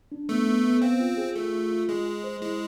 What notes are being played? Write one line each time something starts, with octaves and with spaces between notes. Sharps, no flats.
D4
A3 B3
B3
B3
C4 F5
F4
G#4
A3 F4
F4
F4
G#3 G#4
G#4
C5
G#3 E4